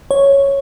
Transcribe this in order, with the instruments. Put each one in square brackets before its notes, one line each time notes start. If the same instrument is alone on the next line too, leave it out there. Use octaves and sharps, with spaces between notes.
[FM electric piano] C#5